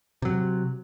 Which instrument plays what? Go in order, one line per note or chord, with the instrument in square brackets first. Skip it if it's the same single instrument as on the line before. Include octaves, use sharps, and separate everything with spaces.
[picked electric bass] C3 F#3